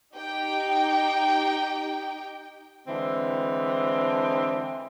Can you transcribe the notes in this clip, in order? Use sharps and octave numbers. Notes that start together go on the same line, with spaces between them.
D#4 G4 G5
D3 E3 G#3 C4